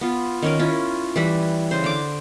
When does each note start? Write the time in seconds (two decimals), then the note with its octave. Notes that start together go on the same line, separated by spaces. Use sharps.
0.01 B3 F4
0.42 D#3 C#4 A#4
0.59 C#4 E4 F4
1.16 E3 G3 B4 E5
1.71 C#3 C5
1.84 D3 D6